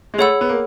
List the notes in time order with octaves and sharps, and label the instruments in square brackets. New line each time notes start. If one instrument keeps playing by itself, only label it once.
[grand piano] G#3
[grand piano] A3 [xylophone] G#4 C#5 F#5 B5 E6
[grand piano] B3
A#3